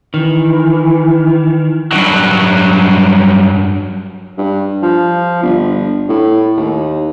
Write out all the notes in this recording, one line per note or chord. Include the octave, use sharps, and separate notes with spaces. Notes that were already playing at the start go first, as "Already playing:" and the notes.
D#3 E3
G2 F#3
G2
F3
G1
A2
D#2